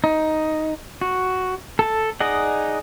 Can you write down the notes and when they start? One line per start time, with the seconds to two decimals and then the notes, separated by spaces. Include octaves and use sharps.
0.04 D#4
1.01 F#4
1.79 A4 A5
2.20 D#4 G#4 D5 D#5 F#5